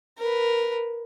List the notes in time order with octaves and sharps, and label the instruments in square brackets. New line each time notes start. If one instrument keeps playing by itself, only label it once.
[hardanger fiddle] A#4 B4